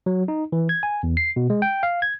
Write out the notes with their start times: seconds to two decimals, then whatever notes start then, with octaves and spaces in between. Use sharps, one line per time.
0.06 F#3
0.28 D#4
0.52 E3
0.69 G#6
0.83 G#5
1.03 E2
1.17 C7
1.36 B2
1.50 G#3
1.62 G5
1.83 F5
2.02 G#6